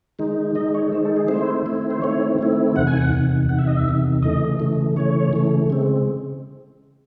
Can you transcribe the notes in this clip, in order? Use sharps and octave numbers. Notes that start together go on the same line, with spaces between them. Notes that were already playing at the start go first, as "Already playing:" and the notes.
D#3 G#3 D#4
D#3 G#3 D#4 D#5
C#5
A4
D#3 G#3 D#4 C5
A4
G#4
D#3 A3 C4 E4 C5
D#3 A3 C4 E4
C5
D#3 A3 C4 E4 C#5
D#3 A3 C4 E4
E2 C3 D#3 F#5
G#5
F#5
E2 C3 D#3
E2 C3 D#3 F#5
E5
D#5
E5
E2 C3 D#3
C#3 E3 A3 D#5
C#3 E3 A3
C#3 E3 A3 C#5
C#3 E3 A3
C#3 G#3 C4